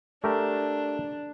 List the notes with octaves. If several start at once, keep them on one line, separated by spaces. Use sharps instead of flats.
A3 D4 G4 A#4